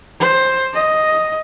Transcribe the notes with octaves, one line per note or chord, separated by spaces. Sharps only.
C5
D#5